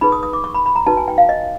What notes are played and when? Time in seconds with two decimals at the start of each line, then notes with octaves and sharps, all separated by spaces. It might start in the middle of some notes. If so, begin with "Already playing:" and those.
0.01 D#4 G#4 B4 B5
0.12 D#6
0.23 D#6
0.33 D6
0.44 C#6
0.55 B5
0.66 B5
0.76 A#5
0.86 D#4 F#4 B4 A5
0.97 G#5
1.08 G5
1.18 F5
1.29 D#5